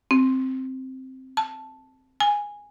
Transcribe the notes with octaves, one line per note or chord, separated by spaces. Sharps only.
C4
A5
G#5